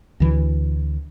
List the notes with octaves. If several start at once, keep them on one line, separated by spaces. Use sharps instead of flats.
D2 E3